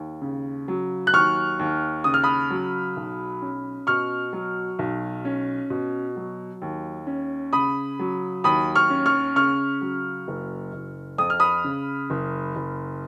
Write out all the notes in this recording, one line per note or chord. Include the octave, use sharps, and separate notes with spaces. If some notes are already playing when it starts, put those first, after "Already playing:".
Already playing: D#2
C#3
F#3
F#6
D#2 C#6 F6
D#2
C#3 D#6
F6
B5 D#6
F#3
B1
C#4
B2 C#6 F6
F#3
B1
C#4
B2
F#3
D#2
C#4
C#3 B5 D#6
F#3
D#2 B5 D#6
C#6 F6
C#4
C#6 F6
C#3 C#6 F6
F#3
F#1
F#1
F2 D#6
F6
B5 D#6
C#3
F#1
F#1